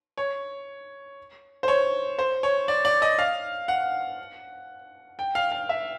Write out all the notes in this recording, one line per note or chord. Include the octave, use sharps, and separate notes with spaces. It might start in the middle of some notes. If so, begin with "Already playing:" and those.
C#5
C5
C#5
C5
C#5
D5
D5
D#5
F5
F#5
G5
F5
F5
E5